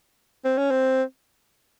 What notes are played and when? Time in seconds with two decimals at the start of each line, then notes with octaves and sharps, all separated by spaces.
0.45 C4
0.58 C#4
0.71 C4